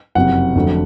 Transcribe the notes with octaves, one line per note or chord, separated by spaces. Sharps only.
F#1 F2 C3 F#5
F1 F2 D3 F#3 A3